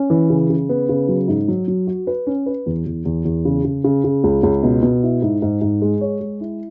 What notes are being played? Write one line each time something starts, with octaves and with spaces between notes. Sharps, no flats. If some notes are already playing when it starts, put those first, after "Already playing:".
Already playing: C#4
E3
C#3
C#3
B3
C#3
F#3
G#2
F#3
F#3
F#4
B4
C#4
B4
E2
E2
E2
E2
C#3
C#3
C#3
C#3
C#2
C#2
B2
B2
E4
G#2
G#2
G#2
G#3
C#5
G#3
E4